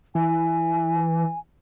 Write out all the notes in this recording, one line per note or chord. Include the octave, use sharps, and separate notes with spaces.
E3 G#5